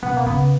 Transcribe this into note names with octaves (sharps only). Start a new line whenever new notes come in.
B2 B3
A#3
C#3 B3